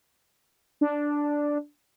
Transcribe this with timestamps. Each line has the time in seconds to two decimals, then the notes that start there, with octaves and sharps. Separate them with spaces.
0.81 D4